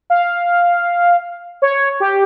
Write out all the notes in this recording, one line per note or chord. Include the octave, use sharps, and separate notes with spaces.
F5
C#5
G4